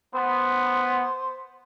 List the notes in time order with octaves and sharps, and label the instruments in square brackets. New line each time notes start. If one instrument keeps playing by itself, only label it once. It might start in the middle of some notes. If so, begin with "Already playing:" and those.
[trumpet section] B3 [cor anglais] C5